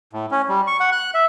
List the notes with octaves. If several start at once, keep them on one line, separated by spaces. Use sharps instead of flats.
A2
C#4
G3
C#6
F#5
F#6
E5